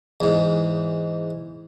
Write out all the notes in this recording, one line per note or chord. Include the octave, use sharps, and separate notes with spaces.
E2 G#2